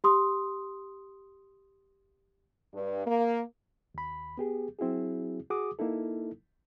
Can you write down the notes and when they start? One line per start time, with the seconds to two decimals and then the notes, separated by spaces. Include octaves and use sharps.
0.04 G4 C6 D#6
2.74 G2
3.06 A#3
3.94 D#2 B5
4.38 B3 G4 G#4
4.79 F#3 C4 E4 F#4 G#4
5.50 F#4 G#4 D6 D#6
5.79 A#3 D#4 E4 A4